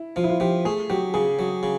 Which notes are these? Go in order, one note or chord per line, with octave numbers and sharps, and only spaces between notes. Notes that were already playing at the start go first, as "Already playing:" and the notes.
Already playing: E4
F3 F4
E4
F4
F3 G4
A3 G#4
F#3 G4
C#3 G#4
F#3
C#3